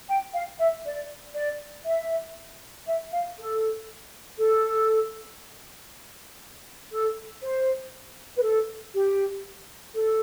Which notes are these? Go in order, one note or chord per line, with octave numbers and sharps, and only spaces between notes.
G5
F5
E5
D5
D5
E5
E5
F5
A4
A4
A4
C5
B4
A4
G4
A4